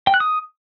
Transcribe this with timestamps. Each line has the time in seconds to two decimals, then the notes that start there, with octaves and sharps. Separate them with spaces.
0.07 G5
0.14 F#6
0.20 D#6